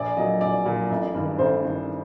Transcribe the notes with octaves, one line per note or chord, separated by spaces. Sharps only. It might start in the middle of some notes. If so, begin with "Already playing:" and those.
Already playing: A#1 D5
A#2 F#3 D#5
A#1 D5
A#2 F#3
A1
G2 D#3
A1 C5
G2 D#3